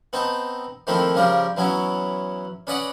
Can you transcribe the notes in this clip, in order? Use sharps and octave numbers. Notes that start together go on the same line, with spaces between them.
B3 C4 D#4 A5
D#3 F3 A3 A#3 C4 E4
C#3 F3 G3 G4 A#4
E3 F#3 B3 C#4 E4
C#4 B4 D5 D#5 F#5